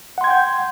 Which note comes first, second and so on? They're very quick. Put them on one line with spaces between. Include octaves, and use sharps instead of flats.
F#5 C6 G#6 G5 G6